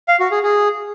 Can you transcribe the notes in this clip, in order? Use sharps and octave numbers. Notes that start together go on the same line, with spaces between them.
F5
F#4
G#4
G#4